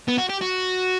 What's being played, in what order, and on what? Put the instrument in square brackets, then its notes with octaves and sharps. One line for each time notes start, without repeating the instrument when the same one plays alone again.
[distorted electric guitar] B3
F#4
G4
F#4